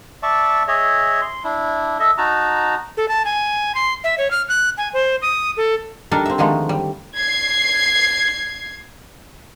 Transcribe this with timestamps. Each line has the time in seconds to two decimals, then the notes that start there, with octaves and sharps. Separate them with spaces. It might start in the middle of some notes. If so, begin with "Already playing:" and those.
0.23 D5 E5 A5 C#6
0.68 G#4 C#5 D#5 E5
1.22 C6
1.44 D4 E4
2.00 A4 D#5 E5
2.18 D#4 F#4 A5 A#5
2.97 A4
3.09 A5
3.25 G#5
3.75 C6
4.04 E5
4.18 C#5
4.31 F6
4.49 F#6
4.77 G#5
4.94 C5
5.22 D#6
5.57 A4
6.11 G3 D4 D#4 A4 A#4
6.26 C4 E5
6.38 D3 D#3 F3 G#3 A3
6.69 G3
7.17 G#6 C7